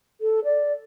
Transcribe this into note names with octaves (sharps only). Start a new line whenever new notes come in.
A4
D5